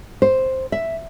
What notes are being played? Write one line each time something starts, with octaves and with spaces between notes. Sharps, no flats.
C5
E5